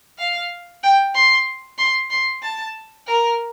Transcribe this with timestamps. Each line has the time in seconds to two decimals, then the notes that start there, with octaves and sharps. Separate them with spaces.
0.19 F5
0.83 G5
1.15 C6
1.78 C6
2.10 C6
2.42 A5
3.07 A#4